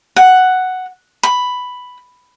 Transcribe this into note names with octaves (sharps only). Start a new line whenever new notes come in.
F#5
B5